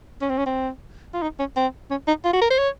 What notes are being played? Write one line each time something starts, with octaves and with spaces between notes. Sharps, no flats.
C#4
C4
C#4
C4
F4
D#4
C#4
C4
C#4
D#4
F4
F#4
A#4
C5
C#5